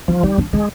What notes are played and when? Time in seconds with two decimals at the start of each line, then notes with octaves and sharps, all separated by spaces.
0.08 F3 D#4
0.23 G3 D#4
0.38 D4
0.53 G#3 D4